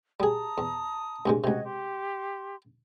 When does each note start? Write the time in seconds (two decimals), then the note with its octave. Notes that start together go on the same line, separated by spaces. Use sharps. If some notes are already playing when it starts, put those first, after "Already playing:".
0.20 G3 G#4 A5 A#5 D#6
0.58 E2
1.26 C2 G2 G#3
1.44 C#2 C3 F#4 D#5 G#6
1.65 G4 C6